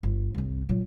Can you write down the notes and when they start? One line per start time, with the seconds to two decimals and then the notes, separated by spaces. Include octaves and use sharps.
0.03 G1
0.34 C2 C4
0.69 A#2 F#3